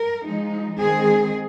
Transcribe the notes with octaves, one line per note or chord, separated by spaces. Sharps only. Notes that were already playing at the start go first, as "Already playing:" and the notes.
Already playing: A#4
F3 G#3 D#4
D#3 G#3 C4 G#4